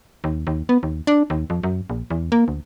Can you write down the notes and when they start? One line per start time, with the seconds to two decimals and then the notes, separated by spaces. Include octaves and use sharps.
0.24 D#2
0.47 D#2
0.69 B3
0.83 D#2
1.07 D4
1.30 D#2
1.50 F2
1.63 F#2
1.90 A#1
2.10 E2
2.32 A#3
2.48 D2